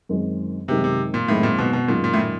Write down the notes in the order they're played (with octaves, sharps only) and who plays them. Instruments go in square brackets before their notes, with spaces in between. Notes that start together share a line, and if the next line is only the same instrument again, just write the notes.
[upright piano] F#2 D#3 G#3 C4
[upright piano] F#2 D#3 G#3 C4 [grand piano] C3
[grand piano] C3
A#2
[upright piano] F#2 D#3 G#3 C4 [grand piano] A2
[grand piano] A#2
B2
B2
[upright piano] F#2 D#3 G#3 C#4 F4 [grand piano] A#2
[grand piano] A#2
A2
A#2